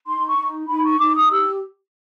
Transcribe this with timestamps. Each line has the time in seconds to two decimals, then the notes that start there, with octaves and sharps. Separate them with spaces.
0.07 D#4 C6
0.28 C#6
0.38 D#4
0.69 D#4 B5
0.85 C#6
1.00 D#4 D6
1.15 D#6
1.31 G4 E6